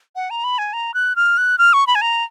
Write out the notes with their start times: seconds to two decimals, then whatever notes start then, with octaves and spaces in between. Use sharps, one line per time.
0.16 F#5
0.30 A#5
0.44 B5
0.58 G#5
0.73 A#5
0.94 F#6
1.16 F6
1.38 F#6
1.58 F6
1.73 C#6
1.87 B5
1.95 G#5
2.02 A#5